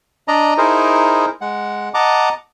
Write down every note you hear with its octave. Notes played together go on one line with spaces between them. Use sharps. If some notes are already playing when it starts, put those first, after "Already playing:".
D4 D5 D#5 A#5
D#4 E4 G#4 A#4 C5
G#3 F#5
D#5 F#5 A5 A#5 D6